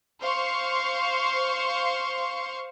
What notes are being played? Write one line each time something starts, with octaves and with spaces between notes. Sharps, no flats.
C5 F5 C6 C#6